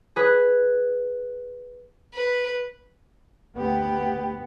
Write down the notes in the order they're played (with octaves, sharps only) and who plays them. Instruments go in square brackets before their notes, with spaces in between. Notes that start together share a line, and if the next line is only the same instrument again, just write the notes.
[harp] G#4 B4
[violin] B4
[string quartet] D2 G4 [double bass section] B3